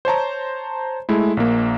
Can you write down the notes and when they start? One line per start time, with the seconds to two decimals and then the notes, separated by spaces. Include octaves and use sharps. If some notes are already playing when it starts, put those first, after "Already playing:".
0.05 C5 C#5 A5 A#5
1.09 G#3 A3 E4
1.37 A#1 A#3